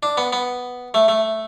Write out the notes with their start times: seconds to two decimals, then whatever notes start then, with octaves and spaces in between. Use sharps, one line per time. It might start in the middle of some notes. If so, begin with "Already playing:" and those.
0.03 D4
0.17 B3
0.33 B3
0.94 A3
1.08 A3